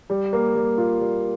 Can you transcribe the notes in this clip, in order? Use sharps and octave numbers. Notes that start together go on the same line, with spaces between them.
G3
A#3
G3
F4
G3